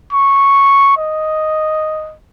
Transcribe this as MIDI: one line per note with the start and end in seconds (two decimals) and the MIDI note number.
0.12 0.97 85
0.97 2.15 75